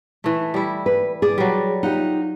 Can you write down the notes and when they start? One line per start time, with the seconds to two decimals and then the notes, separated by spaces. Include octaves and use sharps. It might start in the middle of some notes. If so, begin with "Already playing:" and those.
0.24 E3 A3
0.54 G3 E4
0.86 B4
1.22 G#4 D5
1.38 F#3 G3
1.83 D#4 F4 G4 F#5